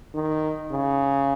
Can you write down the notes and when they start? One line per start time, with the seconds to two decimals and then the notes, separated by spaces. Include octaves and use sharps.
0.14 D#3
0.72 C#3